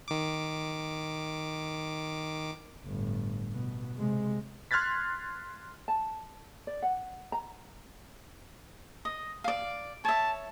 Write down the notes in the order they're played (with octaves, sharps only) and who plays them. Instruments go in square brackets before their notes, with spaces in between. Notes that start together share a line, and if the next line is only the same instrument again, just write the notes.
[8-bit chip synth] D#3 D6
[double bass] G1 A2
B2
C3 G#3
[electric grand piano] C6 F6 F#6 G#6 A6 B6
[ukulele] A5
D5
F#5
A#5
[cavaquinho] D#5
D5 F5
[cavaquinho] C#5 E5 [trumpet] A5